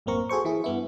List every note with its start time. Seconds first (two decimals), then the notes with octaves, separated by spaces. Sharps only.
0.06 A1 F#2 A#3 C4 A#4 C#6
0.29 F#4 G#4 A4 C5 C#6
0.45 E3 E4 G#4
0.64 G2 B3 E4